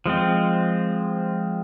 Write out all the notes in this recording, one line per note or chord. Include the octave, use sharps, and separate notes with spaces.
F3 G#3 C4